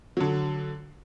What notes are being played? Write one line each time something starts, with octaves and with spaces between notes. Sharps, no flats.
D3 F#3